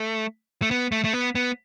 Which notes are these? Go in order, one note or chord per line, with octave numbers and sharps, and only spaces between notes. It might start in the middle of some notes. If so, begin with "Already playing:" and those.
Already playing: A3
A3
B3
A3
A3
B3
B3